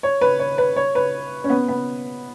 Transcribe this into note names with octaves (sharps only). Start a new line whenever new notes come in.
C#5
B4
C#5
B4
C#5
B4
C#4
B3
B3